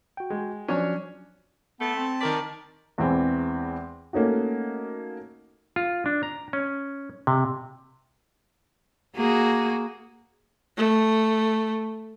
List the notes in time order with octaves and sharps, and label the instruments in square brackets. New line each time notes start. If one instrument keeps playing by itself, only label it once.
[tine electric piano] F#4 G5
[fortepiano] G#3
[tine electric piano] F3 F#3 [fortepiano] C#4 D4 C#5
[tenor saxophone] A3 [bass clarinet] B3 [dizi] A5
[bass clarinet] C4
[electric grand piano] D#3 A#4 B6 [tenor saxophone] D5
[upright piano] E2 E3 G#3 C4
A3 A#3 C#4 D#4 F#4
[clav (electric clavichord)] F4
D4
A#5
C#4
C3
[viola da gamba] A#3 F#4 G#4
[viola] A3